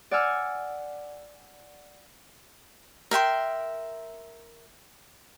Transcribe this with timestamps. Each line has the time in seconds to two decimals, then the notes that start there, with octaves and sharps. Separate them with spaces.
0.11 D5 F#5 G#5 D6 E6 F6
3.11 A#4 E5 G5 C6